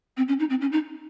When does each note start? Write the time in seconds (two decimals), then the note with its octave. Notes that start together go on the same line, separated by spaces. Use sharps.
0.17 C4
0.28 C#4
0.39 D#4
0.50 C4
0.61 C#4
0.72 D#4